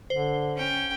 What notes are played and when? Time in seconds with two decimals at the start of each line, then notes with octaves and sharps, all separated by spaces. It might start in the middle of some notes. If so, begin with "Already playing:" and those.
0.10 D3 C5
0.56 C#4 G5